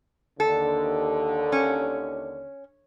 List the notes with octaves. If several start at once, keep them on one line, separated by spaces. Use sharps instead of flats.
D#2 D3 A4
C#4